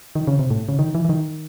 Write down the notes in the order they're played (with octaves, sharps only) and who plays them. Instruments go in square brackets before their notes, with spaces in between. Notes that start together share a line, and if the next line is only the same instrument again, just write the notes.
[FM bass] D#3
C#3
C3
A2
C#3
D#3
E3
E3
D#3